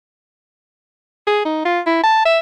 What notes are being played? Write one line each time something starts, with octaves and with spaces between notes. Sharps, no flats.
G#4
D#4
F4
E4
A5
E5